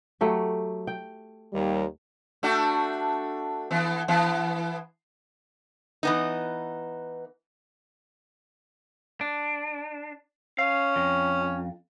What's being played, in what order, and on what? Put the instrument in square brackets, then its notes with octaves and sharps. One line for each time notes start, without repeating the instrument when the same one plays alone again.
[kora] F#3 A3 G4
G5
[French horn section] D#2 G3
[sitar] A3 D4 F#4
E3 B3
E3 B3
[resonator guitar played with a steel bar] E3 B3 D#4
[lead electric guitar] D4
[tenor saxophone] C#4 [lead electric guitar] F5
[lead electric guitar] F2